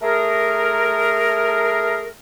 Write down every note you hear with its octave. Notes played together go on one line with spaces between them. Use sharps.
A3 G#4 A#4